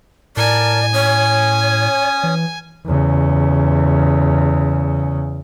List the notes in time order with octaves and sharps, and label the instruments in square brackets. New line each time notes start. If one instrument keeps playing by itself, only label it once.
[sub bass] A2 [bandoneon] A#4 A5 [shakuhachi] D5 [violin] G#5
[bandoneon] C#4 D#6 [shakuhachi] C#5
[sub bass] E3
[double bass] E2 C#3